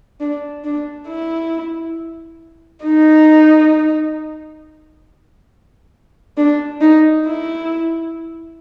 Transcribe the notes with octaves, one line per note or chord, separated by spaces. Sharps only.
D4
D4
E4
D#4
D4
D#4
E4